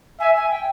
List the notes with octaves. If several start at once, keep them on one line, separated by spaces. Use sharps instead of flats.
E5 G#5
G#5
G5